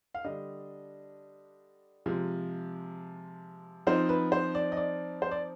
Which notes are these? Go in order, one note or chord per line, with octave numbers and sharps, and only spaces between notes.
F5
D3 G3 D4 D#5
C3 F3 G#3
F3 C4 D#4 C5
B4
C5
D5
D#5
D5
C5
D5